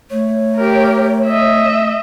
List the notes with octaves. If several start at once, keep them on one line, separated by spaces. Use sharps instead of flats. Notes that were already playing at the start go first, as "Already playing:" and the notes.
A3 C#5
G4 A#4
D#5 E5